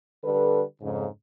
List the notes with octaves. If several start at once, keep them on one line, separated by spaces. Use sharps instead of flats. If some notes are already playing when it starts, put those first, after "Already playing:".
D3 G3 A4 B4
F2 G#2 C#3